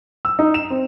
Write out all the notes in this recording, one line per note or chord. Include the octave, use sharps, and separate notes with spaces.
E6
D#4
E7
C4